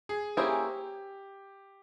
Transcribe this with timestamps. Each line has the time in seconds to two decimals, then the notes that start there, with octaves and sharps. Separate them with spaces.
0.09 G#4
0.37 A#3 C#4 E4 G4 G#4 C5